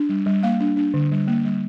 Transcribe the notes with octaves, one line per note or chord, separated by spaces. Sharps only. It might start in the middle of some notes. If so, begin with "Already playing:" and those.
Already playing: D4
G3
G3
A#3 F5
D4
D4
D3
G3
A#3
G3